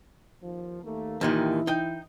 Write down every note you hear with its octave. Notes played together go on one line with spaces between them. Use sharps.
D#2 F3
D#2 A3 A#3
D#2 A#2 D#3 E3 E4
D#4 G5